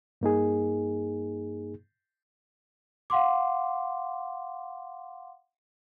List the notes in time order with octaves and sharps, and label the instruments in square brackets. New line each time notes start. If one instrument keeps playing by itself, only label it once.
[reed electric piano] G2 A#3 D#4 G#4
[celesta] F5 F#5 C6 D6